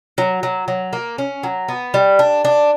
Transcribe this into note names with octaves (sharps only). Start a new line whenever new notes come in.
F#3
F#3
F#3
A#3
C#4
F#3
B3
G3
D4
D4